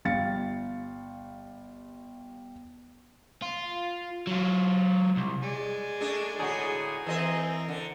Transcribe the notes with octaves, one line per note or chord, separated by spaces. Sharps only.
G1 G3 F5 A6 C#7
F4
F#3 F4
C2
G#3 D5 G#5
A3 D4 G#4
A2 D3 D#4 F#4 G#4
E3 C4 A#4 D#5 E5
D3